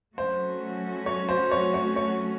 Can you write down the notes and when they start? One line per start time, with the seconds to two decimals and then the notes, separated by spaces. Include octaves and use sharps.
0.18 F#3 A3 C#4 F#4 C5
1.06 C#5
1.29 C5
1.51 C#5
1.74 C#5
1.96 C#5